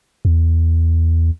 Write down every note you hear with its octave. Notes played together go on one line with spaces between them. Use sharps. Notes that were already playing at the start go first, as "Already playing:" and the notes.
E2